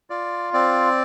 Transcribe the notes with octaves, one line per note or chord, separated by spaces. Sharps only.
F4 D5
C4 D5